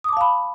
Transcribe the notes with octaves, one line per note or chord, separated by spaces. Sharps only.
F5 A5 B5 D6 D#6